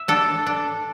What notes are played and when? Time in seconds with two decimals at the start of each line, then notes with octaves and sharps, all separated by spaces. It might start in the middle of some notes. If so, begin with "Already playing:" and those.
Already playing: E5
0.08 D4 A4
0.47 D4